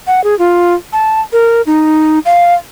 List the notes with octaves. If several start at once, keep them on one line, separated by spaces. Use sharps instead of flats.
F#5
G#4
F4
A5
A#4
D#4
F5